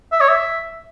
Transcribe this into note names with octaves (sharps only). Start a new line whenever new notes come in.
E5
C#5
E5